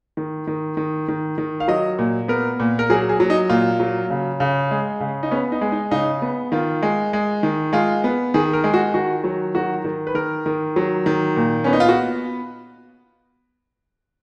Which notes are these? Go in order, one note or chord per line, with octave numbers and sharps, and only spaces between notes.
D#3
D#3
D#3
D#3
D#3
F5
F#3 D#5
A#2
B3 A#4
A#2
A#4
F#3 G#4
G#4
F#3
D#4
A#2 F4
F#3
C#3
C#3
G#3
C#3
D#4
B3 C#4
D#4
G#3
D#4
C#3 D#4
B3
D#3 F4
G#3
G#3
D#3
G#3 F4
B3
D#3 G#4
A#4
G#3
F#4
D#3 F#4
F#3
D#3 F#4
D#3
B4
D#3 A#4
D#3
F#3
D#3
A#2
B3 C#4
D#4
F4
F#4